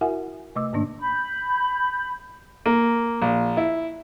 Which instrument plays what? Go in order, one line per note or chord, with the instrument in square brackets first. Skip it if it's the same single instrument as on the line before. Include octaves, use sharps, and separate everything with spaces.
[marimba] E4 F#4 A#4 E5 F#5 G#5
C3 A3 D#5 D6 E6
G#2 D#3 A#3 D4
[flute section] B5 G6
[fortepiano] A#3
A#1
E4